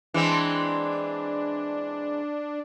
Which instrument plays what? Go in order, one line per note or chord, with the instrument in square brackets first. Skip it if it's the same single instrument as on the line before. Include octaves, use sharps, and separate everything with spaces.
[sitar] E3 G#3 C4 [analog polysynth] D4